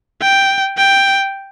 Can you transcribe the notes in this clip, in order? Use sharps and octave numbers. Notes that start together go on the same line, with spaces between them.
G5
G5